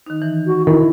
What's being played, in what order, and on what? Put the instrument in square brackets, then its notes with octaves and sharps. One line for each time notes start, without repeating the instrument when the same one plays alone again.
[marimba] D#3 D#4
E3
[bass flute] F#4
[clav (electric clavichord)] D#3 [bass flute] E4 [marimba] A#4